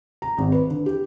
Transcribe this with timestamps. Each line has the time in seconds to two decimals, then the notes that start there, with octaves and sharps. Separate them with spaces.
0.22 A#5
0.38 G#1
0.52 B4
0.70 D3
0.86 G4